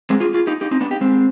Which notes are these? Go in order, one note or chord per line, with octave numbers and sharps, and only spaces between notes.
G#3 C4
F4 G#4
F4 G#4
D#4 G4
D#4 G4
C4 D#4
B3 D4
D#4 G4
G#3 C4